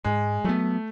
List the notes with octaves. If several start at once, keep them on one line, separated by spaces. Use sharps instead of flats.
G#2 G#3
F#3 A3 B3